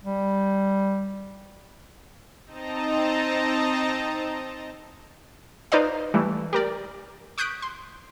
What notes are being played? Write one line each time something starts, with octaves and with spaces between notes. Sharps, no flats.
G3
C4 D#4 D#5 A5 A#5
D#4 B4 C5 D5 D#5 F5
E3 G3 A3
G4 A#4 D5
C#6 D#6 F#6 G6 B6 D7
C6